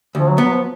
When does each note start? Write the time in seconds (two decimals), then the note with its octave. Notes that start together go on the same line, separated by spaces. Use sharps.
0.15 D2 F3
0.30 F#3
0.38 B3
0.45 F#3
0.53 F3